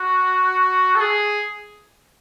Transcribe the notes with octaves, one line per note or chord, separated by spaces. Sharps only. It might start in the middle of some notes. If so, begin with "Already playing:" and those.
Already playing: F#4
A4
G#4